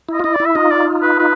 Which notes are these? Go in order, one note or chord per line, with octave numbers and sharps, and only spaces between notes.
E4 D#5
F4
E4 D#5
D5
E4
E5
D#4 F4 D#5
D5
B4
B4